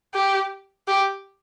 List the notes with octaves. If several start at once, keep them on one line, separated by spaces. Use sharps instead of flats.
G4
G4